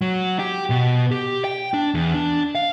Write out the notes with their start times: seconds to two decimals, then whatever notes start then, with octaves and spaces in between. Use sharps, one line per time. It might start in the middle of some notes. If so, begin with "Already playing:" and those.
0.01 F#3
0.39 G4
0.70 B2
1.11 G4
1.44 G5
1.74 D4
1.94 E2
2.14 D4
2.55 F5